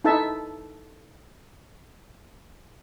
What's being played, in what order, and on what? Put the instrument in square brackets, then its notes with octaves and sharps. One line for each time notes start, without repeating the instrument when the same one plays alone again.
[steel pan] D#4 E4 A4 E5 A5